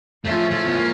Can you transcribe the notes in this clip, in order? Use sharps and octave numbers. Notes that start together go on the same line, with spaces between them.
A2 F3 G#3 A3 C#4 F4
A3
B3
A#3